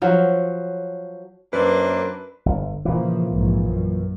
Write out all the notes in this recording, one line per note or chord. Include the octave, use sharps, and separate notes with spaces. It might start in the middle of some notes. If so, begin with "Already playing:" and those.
F3 F#3
F#2 A#3 C4 D4 B4
G1
A#2 C#3 E3 F3
A#1 G#2
F#2